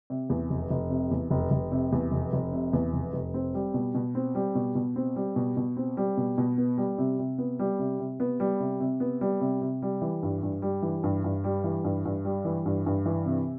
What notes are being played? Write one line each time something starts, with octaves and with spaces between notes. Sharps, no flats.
C3
E2
F1
F1
C3
E2
F1
F1
C3
E2
F1
F1
C3
E2
F1
F1
C4
G3
B2
B2
C4
G3
B2
B2
C4
G3
B2
B2
C4
G3
B2
B2
B3
G3
C3
C3
B3
G3
C3
C3
B3
G3
C3
C3
B3
G3
C3
C3
G3
E3
G2
G2
G3
E3
G2
G2
G3
E3
G2
G2
G3
E3
G2
G2
E3
C3